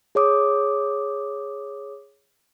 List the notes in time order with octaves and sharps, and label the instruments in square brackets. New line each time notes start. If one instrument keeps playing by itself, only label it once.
[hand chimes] G#4 C#5 D6 D#6